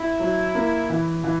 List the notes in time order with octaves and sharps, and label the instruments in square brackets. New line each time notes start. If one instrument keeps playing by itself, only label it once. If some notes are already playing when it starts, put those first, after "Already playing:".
Already playing: [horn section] E4
[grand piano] F#3
A#3
E3
E3